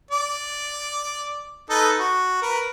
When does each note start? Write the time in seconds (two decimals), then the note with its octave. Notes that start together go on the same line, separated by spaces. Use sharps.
0.11 D5
1.70 D#4 A4 B4
1.99 F#4
2.42 A#4 B4